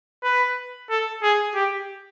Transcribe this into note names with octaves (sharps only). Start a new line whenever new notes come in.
B4
A4
G#4
G4